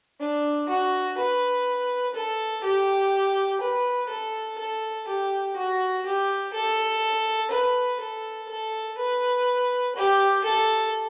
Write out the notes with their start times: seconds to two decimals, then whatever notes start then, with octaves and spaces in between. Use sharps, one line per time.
0.19 D4
0.69 F#4
1.18 B4
2.14 A4
2.64 G4
3.61 B4
4.09 A4
4.58 A4
5.07 G4
5.57 F#4
6.06 G4
6.53 A4
7.51 B4
8.00 A4
8.49 A4
8.98 B4
9.96 G4
10.44 A4